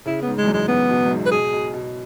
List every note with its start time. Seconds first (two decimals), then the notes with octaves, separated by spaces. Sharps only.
0.06 C#3 E4
0.22 B3
0.27 G#2
0.38 G#3
0.43 E2
0.48 F#2
0.53 G#3
0.68 F#2 B3
0.89 B2
1.06 F#2
1.11 G#2
1.26 B4
1.31 B2 G#4
1.53 B2
1.74 B2